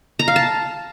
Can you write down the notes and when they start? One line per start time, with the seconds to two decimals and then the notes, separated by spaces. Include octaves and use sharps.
0.19 A#5
0.28 F5
0.36 A5